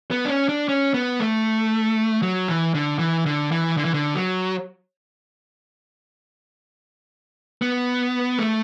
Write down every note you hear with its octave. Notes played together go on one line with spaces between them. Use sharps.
B3
D4
C#4
D4
C#4
B3
A3
F#3
E3
D3
E3
D3
E3
D3
E3
D3
F#3
B3
A3